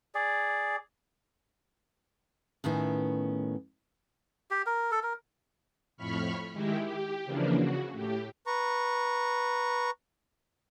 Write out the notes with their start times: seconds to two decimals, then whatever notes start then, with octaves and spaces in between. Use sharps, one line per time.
0.15 G#4 D5
2.64 A2 D#3 B3 C#4
4.51 G4
4.66 A#4
4.91 A4
5.03 A#4
5.97 F2 A2 B5 C#6 F6 B6
6.52 D#3 G#3 E4 G4
6.84 G4
7.25 C#3 E3 F3 A#3 D4
7.56 C#3 F#4
7.91 A2 G4
8.47 B4 A#5 C#6